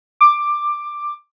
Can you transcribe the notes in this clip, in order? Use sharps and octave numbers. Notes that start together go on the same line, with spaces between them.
D6